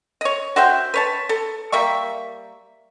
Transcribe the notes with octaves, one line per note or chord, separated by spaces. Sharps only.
C#5 D#5
F#4 C5 E5 G5
B4 C#5 A5
A4
G3 A#3 E5 C#6